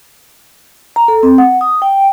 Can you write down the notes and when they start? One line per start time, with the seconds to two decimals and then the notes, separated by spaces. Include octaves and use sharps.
0.96 A#5
1.08 A4
1.23 C4
1.38 F#5
1.61 D#6
1.82 G5